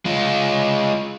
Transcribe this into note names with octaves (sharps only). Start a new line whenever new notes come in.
G#3 F4